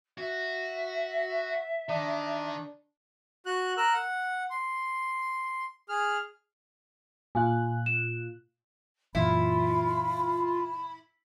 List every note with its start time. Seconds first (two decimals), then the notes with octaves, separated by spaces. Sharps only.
0.18 F#4 E5
1.89 D#3 D4
3.46 F#4 F#6
3.77 A#4 E6 F#6
3.93 F#5
4.50 C6
5.89 G#4 F6
7.35 A#2 F4 F5 G#5 F#6
7.86 E7
9.15 F#2 A#2 E3 E4 F4 B5